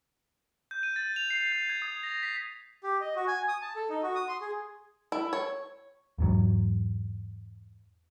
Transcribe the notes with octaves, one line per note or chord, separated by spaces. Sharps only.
G6
D#7
A6
F7
C7
G6
G#6
D#6
A#6
B6
G4
D#5
F#4
G#5
D#6
A5
A4
D#4
F#4
D#6
C6
G#4
E4
C#5
E2 G#2 F#3